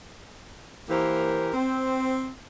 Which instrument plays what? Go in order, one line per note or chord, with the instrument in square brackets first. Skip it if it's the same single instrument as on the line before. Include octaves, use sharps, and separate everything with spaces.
[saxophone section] E3 A#3 G4 A#4 C5
C4